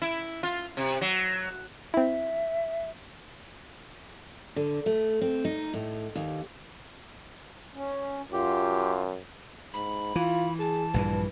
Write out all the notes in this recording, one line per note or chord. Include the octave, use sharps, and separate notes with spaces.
E4
F4
C3
F#3
C4 E4 E5
D3
A3
C4
D#4
A2
D#2
C#4
F#2 F4 G4
G#2 B5
E3 F4
G#4 A5
A#1 G2 E3 B4